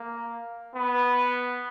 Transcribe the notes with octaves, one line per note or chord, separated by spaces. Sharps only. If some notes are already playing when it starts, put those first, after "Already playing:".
Already playing: A#3
B3